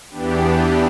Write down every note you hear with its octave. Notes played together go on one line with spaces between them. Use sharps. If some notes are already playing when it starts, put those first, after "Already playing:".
E2 E3 B3 D4 G4